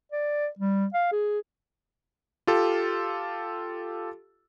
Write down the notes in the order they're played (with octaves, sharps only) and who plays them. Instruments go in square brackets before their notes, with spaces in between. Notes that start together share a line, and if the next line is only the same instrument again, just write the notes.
[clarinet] D5
G3
F5
G#4
[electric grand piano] F4 G4 A4